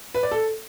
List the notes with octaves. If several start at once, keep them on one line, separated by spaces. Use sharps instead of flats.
B4
D5
A4